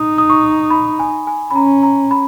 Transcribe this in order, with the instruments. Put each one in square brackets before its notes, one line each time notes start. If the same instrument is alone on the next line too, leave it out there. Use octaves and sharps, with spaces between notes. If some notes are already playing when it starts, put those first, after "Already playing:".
Already playing: [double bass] D#4 [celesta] D#6
[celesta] D#6
C#6
B5
G#5
G#5
B5
[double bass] C#4 [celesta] A#5
[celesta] A#5
B5